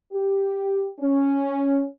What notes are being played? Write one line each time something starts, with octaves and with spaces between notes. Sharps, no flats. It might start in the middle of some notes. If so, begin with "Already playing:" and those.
G4
C#4